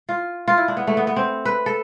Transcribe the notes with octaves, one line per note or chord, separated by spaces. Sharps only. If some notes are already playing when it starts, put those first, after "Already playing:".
F4
F4
E4
D4
B3
A3
B3
B3
C4
B4
A4